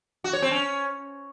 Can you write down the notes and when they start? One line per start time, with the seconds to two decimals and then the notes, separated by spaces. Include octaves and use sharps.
0.24 F#4
0.33 C#5
0.42 C4
0.51 C#4